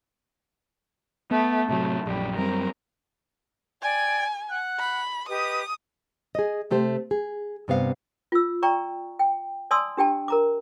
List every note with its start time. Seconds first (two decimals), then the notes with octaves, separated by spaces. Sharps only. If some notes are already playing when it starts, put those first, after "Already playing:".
1.31 A3 B3
1.69 A2 C3 F#3 A3
2.06 A#1 F#2 G3
2.38 F#2 G3 C4 A#4
3.82 D5 G5 G#5 G#6
4.49 F#5 F#6
4.79 B5
5.29 G4 B4 D#5 D#6
6.35 G#4 D#5
6.71 C3 A3 G4 C5
7.11 G#4
7.68 G2 C3 B3 F5
8.32 F4 E6
8.63 D5 G5 A#5 C#6
9.19 G5
9.71 D5 G#5 A5 C6 D#6 E6
9.97 D4 G4 G5 A5
10.28 A#4 A#5 D6